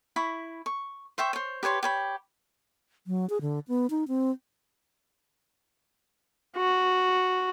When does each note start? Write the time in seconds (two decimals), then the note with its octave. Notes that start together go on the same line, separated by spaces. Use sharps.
0.16 E4 B5 C#6
0.66 C#6
1.18 C5 E5 G5 C#6
1.33 C5 C#5
1.63 G4 B4 C#5 C6
1.83 G4 C#5 B5
3.07 F#3
3.30 G#4
3.41 D3
3.68 B3
3.90 D#4
4.08 C4
6.57 F#4